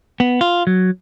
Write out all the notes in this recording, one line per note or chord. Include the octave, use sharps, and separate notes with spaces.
B3
F4
F#3